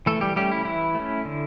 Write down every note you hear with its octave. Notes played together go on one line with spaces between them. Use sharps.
E3 A3 A4
G3 G4
G3 A3 C#4 G4
E4
E3 E4
A3 C#4
D3